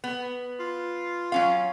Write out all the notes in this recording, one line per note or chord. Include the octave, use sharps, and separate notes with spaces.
B3
F4
F#3 C#4 F5